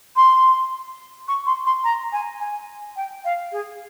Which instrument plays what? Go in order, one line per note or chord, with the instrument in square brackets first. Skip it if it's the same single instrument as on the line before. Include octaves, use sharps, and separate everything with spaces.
[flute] C6
C#6
C6
C6
A#5
G#5
G#5
G5
F5
G#4